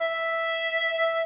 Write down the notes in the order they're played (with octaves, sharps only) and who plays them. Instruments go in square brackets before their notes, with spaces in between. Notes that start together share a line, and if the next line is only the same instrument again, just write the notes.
[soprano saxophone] E5